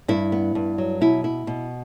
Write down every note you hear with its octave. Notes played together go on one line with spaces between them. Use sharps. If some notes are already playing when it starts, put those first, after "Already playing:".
G2 E4
B3
G2
F#3
B2 E4
E4
B2